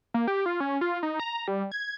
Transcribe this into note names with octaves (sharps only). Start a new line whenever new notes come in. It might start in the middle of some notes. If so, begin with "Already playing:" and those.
A#3
G4
F4
C#4
F4
D#4
A#5
G3
G#6